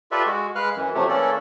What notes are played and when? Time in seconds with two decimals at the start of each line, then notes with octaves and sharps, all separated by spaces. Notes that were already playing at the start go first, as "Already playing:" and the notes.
0.12 F4 G4 A4 B4 D5 E5
0.26 G#3 F#4
0.55 G#3 B4 F5 F6 F#6
0.76 F#2 E3
0.95 C3 F3 F#3 A3 G4
1.09 E3 A#3 C#4 A4 D5